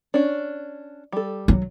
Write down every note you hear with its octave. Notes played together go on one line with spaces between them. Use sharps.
C#4 D4
G3 A4
F#3